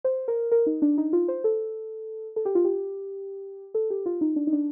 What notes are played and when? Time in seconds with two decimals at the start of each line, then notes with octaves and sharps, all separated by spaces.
0.04 C5
0.28 A#4
0.52 A#4
0.66 D#4
0.82 D4
0.98 D#4
1.13 F4
1.28 C5
1.44 A4
2.36 A4
2.45 G4
2.55 F4
2.65 G4
3.74 A4
3.90 G4
4.06 F4
4.21 D#4
4.36 D4
4.47 D#4
4.53 D4